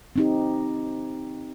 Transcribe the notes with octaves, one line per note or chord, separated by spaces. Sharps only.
C4 D#4 G4